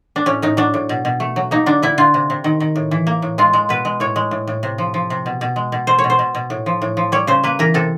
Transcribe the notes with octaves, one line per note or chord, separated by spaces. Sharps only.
D4
A2 C#4
A2 D#4
F#3 D4
A2
B2
B2
A3
F#3
A#3 D#4
D3 D4
D3 E4
D3 F4
C3
C3
D#3
D#3
A2
E3
A#3
A2
G#3 F4
G#3
B2 B4
G#3
A2 C#5
G#3
A2
A2
C3
F3
F3
C3
B2
B2
G#3
B2
B2 C5
C#5
B2
C5
B2
B2
A2
F3
A2
F3
G3 C#5
C#3 C5
A#3 B4
E3 A#4
C3 A4